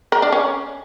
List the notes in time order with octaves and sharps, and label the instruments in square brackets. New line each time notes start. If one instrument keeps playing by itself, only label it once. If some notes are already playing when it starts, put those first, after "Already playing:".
[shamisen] A#4
D4
C#4